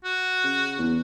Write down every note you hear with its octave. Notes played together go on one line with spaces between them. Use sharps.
F#4
C#3
E2